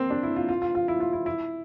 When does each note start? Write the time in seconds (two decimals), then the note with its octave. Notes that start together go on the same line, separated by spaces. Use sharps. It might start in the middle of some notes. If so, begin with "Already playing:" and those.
Already playing: A#3 C4
0.10 D4
0.23 E4
0.36 F4
0.49 F4
0.62 F4
0.75 F4
0.88 E4
1.00 F4
1.13 E4
1.26 E4